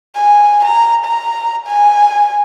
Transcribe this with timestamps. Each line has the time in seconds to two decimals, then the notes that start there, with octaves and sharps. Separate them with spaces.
0.14 G#5
0.65 A#5
1.04 A#5
1.66 G#5